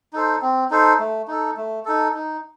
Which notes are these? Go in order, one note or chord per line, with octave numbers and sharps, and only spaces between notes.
D#4 A4 C5
C4
D#4 A4 C5
A3
D#4 A4
A3
D#4 A4
D#4